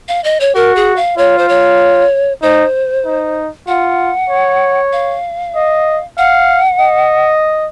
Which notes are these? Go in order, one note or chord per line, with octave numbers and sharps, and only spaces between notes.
F5
D#5
C#5
F#4 A#4
G#4
F5
F4 C#5
C5
C#5
D#4 C5
D#4
F4 F#5
C#5
F5
D#5
F5 F#5
D#5